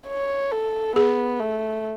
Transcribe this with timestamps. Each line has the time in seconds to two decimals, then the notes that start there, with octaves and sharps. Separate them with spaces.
0.08 C#5
0.52 A4
0.96 B3 G#4
1.40 A3